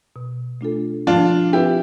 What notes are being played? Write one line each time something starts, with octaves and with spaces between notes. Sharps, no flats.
B2
A3 D4 F4 A4
F3 D4 F4
C4 E4 F4 G4 B4